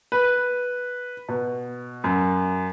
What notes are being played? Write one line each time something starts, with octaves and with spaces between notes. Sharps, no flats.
B4
B2
F#2